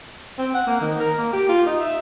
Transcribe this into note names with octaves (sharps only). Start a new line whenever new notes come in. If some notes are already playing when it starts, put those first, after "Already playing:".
C4
F#5
A#3
D#3
A#4
A#3
G4
F4
D#4
E5